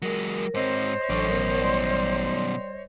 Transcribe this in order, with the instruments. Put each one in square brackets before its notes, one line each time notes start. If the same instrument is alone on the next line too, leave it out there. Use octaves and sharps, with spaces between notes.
[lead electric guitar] F#3 G#3 [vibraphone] A#4
[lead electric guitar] G#2 C4 [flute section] C5 C#5 D#5
[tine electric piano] A1 [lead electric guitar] F#2 D4 [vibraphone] A4 C#6
[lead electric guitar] F#2 B2 [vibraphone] A#4
[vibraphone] G3 D5 C6